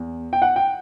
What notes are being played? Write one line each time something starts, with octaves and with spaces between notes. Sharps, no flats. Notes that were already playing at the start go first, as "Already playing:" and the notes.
Already playing: E2
G5
F#5
G5